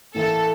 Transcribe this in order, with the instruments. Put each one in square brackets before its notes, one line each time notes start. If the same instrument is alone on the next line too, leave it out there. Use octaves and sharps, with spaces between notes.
[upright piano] A2 E3 A#3 E4 [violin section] A4